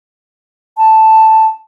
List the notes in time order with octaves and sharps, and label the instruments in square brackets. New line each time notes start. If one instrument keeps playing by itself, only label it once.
[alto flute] A5